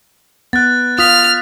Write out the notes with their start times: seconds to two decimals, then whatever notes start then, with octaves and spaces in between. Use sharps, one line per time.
0.53 B3 F#6 A6
0.99 F4 D#6 F6 B6